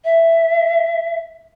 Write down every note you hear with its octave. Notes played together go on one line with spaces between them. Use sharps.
E5